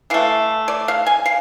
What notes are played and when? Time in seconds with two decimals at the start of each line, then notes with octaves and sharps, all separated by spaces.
0.10 E3 A3 F5
0.68 D5
0.88 F5
1.06 G#5
1.26 F5